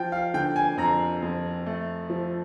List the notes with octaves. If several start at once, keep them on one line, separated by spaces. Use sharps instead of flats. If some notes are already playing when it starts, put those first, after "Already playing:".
Already playing: F3 G5
F5
D3 G5
G#5
F2 A#5
F2
A3
F3